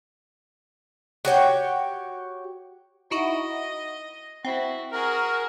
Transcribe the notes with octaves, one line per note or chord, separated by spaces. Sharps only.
F#4 G4 C#5 G5
D#4 E4 F#4 D#5
C4 E4 F#4
F#4 G#4 A#4